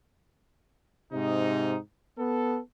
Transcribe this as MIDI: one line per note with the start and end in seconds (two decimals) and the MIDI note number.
1.13 1.77 44
1.13 1.77 48
1.13 1.77 63
2.18 2.59 59
2.18 2.59 69